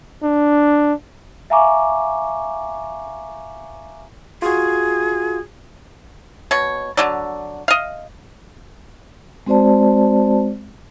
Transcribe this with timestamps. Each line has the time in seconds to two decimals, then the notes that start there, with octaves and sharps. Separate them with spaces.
0.23 D4
1.50 E5 F5 G#5 A#5 C#6 D6
4.42 F4 F#4 G#4
6.51 B2 C#5
6.97 D3 F#3 D5
7.68 D#5 F5
9.46 G#3 C4 F#4 C5 D5 A5